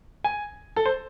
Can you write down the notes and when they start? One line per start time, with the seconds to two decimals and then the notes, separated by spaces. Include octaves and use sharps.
0.24 G#5
0.76 A4
0.86 C5